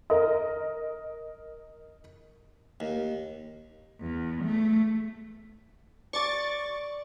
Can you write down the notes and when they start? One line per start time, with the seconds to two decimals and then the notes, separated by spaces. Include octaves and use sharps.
0.10 A#4 D#5
2.80 D#2
4.00 E2
4.44 A3
6.13 D5 C#6 D6 A6